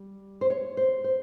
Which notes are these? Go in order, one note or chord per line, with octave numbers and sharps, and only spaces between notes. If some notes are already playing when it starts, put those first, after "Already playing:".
Already playing: G3
C5
C#5
C5
C5